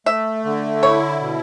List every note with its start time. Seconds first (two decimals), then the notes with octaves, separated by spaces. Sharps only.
0.06 A3 E5
0.45 D3
0.83 E4 C#5
1.21 B2